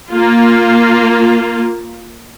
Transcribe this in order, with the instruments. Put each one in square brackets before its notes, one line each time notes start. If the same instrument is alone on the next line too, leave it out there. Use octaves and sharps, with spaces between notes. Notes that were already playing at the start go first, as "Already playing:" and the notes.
[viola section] A#3 F4